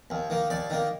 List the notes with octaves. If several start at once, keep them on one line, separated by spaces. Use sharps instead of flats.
D#2
D#3 A#3
D#2 D5
D#3 A#3